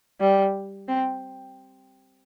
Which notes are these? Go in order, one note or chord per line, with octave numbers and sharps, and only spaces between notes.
G3
C4